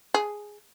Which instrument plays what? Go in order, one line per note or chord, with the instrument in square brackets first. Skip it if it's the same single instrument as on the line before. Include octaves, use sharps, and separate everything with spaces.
[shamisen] G#4